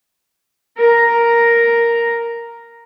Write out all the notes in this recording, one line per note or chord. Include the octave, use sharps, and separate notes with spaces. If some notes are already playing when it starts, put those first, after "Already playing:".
A#4 A#5